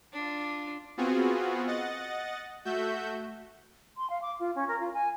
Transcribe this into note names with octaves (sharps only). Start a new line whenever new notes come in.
D4 F4
B3 C4 F4 F#4 G#4
D#5 F#5 A6
A3 F#4 E5 G6
C6
F5
D6
F4
C#4
A#4
F4
G#5